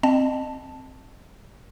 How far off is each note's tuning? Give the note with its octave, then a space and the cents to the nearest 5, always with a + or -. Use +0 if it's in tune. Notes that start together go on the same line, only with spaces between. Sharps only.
C4 +0 D#5 -30 A5 +0